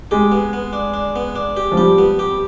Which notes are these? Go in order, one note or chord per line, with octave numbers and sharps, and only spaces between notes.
G#3 G4
B3
B3
D4
D4
B3
D4
G4
F3
G3 G4
B3
G4